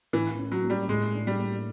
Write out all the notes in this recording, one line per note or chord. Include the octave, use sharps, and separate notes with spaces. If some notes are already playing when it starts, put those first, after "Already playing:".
A2 E3
C#4
F#3
A#3
G3
A2 G#3
D4
G3
A#3